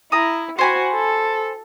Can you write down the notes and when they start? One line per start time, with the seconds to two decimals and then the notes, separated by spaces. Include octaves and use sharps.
0.12 E4 A#5 D#6
0.59 F#4 C5 G#5 B5
0.94 A4